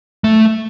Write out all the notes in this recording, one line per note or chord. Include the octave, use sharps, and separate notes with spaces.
A3